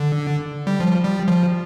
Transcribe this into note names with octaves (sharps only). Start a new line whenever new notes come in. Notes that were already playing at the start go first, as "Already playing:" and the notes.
Already playing: D3
G3
F3
G3
F3